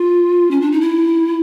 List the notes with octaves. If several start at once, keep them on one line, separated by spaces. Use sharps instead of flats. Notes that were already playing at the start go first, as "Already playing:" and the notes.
Already playing: F4
C#4
D4
D#4
E4